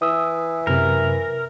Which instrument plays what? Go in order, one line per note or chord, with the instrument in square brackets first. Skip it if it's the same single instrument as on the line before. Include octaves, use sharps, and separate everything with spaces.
[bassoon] E3 [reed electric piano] D#6 E6
[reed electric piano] F#2 C3 [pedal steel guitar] A#4